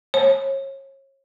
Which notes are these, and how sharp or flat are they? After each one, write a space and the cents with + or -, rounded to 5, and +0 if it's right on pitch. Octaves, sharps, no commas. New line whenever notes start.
C#5 -35